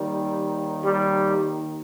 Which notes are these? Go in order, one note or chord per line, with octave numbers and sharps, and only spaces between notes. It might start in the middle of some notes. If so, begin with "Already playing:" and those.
Already playing: D#2 D#3 G3
G3